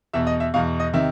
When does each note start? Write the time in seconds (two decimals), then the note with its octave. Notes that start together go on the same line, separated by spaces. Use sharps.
0.13 E2 B2 E5
0.27 D#5
0.40 E5
0.54 E2 B2 F5
0.80 D#5
0.93 C3 D#3 E5